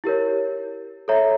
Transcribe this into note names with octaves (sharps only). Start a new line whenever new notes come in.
E4 G4 A#4 C#5
A4 C#5 E5 A#5